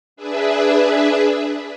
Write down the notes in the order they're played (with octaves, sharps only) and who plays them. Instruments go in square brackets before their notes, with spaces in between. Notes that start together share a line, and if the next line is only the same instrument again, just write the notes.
[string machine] D4 G#4 B4 E5